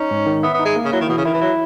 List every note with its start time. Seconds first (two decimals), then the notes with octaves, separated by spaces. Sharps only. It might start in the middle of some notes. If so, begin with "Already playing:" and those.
Already playing: C#4 D#4
0.11 G#2
0.26 D#3
0.43 B3 E5
0.54 B3
0.59 D#4
0.65 G#3
0.76 A#3
0.85 C#3
0.93 F#3 E4
1.01 D#3
1.09 B2 E3
1.17 C#3
1.25 D#3 E4
1.34 E3
1.41 F#3 E4